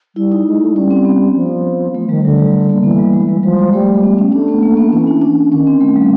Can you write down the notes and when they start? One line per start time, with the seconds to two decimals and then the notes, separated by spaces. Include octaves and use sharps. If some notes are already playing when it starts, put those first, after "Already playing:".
0.16 G3 E4
0.32 D#4
0.46 G#3
0.61 A3
0.75 G3 C#4
0.90 C4
1.05 B3
1.35 F3
1.94 F3 A3
2.09 D#3 G3
2.24 D3 F#3
2.39 G3
2.54 G3
2.69 A#3
2.83 E3 B3
2.98 G3
3.13 G#3
3.29 G3
3.43 F3 G3
3.59 G#3
3.73 G3 A3
4.03 B3
4.18 C#4
4.32 A3 D4
4.48 B3
4.63 A#3
4.77 B3
4.91 E3 C#4
5.07 D4
5.22 D4
5.51 D#3 C#4
5.67 C4
5.81 A3
5.96 G3